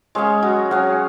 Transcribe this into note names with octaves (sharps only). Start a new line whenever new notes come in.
G#3 C#4 G#4 C#5 F5
F#3
F#3 C#4 G#4 C#5 F5